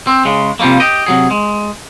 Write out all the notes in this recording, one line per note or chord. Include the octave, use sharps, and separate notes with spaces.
C4
C#3 G#3
C3 F3 G3 A3 A#3
G4 D#5
C3 F#3 G#4
G#3